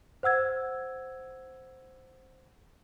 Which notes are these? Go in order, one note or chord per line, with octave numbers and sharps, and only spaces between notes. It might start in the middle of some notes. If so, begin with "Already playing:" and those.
C5 F#5 E6 G#6